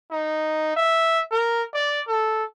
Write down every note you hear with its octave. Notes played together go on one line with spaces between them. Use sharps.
D#4
E5
A#4
D5
A4